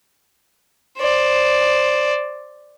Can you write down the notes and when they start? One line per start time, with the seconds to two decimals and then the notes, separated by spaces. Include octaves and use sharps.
0.99 C5 D5